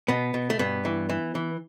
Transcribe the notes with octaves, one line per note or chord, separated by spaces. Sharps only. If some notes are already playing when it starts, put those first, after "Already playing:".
B2 B3
B2
A3
G2 B3
E3
E3
E3